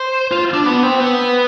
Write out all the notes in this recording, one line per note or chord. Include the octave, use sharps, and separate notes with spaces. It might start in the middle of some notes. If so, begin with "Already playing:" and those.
Already playing: C5
F4
D4
B3
C4
B3